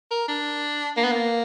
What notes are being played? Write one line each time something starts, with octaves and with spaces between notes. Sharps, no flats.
A#4
D4
A#3
B3
A#3